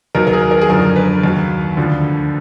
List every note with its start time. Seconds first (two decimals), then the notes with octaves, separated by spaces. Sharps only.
0.15 D#2 D#3 F#3 A#4
0.27 A#4
0.33 G#4
0.51 A#4
0.61 G#4
0.69 F#2 D3 F3 A#4
0.96 B4
1.23 D#2 D#3 F#3
1.77 D2 D3 F3